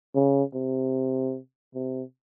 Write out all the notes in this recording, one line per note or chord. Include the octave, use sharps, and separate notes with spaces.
C#3
C3
C3